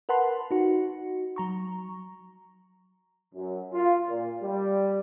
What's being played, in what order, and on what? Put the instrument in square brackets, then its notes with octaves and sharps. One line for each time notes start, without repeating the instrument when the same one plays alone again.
[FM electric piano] A#4 B4 F#5 A5 B5 C6
D#4 F#4
F#3 A#5 C#6
[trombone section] F#2
F4
A#2
G3